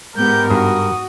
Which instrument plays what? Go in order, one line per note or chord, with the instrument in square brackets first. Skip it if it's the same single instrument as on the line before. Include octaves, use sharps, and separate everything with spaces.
[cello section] G#2 B3 G4 [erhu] A#4 [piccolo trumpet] G6
[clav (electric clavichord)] G2 [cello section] F#4 [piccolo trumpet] D#6